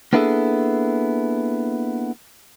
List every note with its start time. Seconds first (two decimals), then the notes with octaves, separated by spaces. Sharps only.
0.13 A#3 B3 D4 E4 G#4 A4